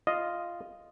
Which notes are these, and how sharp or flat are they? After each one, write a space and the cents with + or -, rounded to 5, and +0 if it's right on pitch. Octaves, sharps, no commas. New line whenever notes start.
F4 -5 D#5 +0